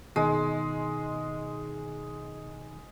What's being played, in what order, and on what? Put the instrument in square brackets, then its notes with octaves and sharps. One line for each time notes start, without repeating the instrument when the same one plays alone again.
[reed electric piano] B2 D#3 D#4 [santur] G#3